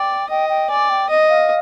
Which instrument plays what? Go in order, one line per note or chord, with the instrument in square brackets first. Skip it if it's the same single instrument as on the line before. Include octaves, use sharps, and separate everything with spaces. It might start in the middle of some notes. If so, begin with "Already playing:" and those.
Already playing: [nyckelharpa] D5 [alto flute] G5
[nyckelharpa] D#5 [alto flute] G5
[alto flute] G5
[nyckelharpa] D5 [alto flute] G#5
[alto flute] G5
[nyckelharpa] D#5
[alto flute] F5